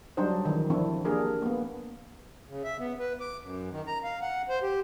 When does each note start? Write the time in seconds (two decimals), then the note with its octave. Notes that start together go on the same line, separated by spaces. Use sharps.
0.17 F#3 G3 D4 D#4 C5
0.45 D#3 E3
0.70 F3 C4 D4 E4
1.05 A#3 D4 G4 G#4 A#4
1.42 A#3 B3
2.48 C#3
2.64 E5
2.79 B3
3.00 B4
3.20 D6
3.43 F#2
3.71 D#3
3.87 A#5
4.03 F5
4.22 F#5
4.49 C5
4.63 G4